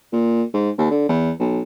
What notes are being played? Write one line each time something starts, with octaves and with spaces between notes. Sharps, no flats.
A#2
G#2
D#2
D3
E2
B1